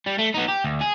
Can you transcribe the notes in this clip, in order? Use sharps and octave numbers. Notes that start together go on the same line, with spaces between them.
G3
A3
B3 D#4
G4
D2
G#4